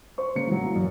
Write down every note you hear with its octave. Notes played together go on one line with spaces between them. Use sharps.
C5 C#6
C#3 A#3 C#7
E3 F#3
A#3
F#2